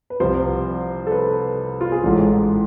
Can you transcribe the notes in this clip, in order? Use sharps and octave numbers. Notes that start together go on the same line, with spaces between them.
B4
C2 C3 F3 C5
A4
B4
F4
G#4
A1 G#2 E3 A4